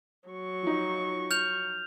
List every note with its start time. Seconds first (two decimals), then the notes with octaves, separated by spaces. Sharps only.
0.29 F#3 C#6
0.63 F3 D#4
1.31 F6 G6 F7